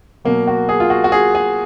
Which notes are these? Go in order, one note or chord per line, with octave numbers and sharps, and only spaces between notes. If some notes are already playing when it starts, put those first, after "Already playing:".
B2 F#3 A#3
F#4
G#4
F4
F#4
F#4
G#4
G#4